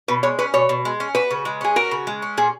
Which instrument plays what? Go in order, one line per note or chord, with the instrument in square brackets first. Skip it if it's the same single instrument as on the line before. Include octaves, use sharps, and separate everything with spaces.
[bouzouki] B2 [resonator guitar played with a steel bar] B4
[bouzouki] G#3 [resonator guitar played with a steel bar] C#5
[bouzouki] C#4 [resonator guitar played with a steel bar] B4
[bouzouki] B2 [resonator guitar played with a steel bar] C#5
[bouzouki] B2
G#3
C#4
[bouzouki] F#4 [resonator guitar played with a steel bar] B4
[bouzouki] C#3
G#3
[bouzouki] C#4 [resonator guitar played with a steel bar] G#4
[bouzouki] F#4 [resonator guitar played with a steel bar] A#4
[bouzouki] C#3
G#3
C#4
[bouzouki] A#2 [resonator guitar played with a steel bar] G#4